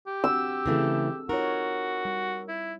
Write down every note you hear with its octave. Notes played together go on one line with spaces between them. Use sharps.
G4
C4 D4 F#4 E6
C#3 E3 A3 C4 G#4 A4
D#4 F4 F#4 A#4 C#5
G3
E4